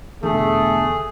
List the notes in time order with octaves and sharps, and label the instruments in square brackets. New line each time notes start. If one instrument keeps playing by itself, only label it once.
[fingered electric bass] E2 B2 D3 [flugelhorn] A3 [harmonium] G#4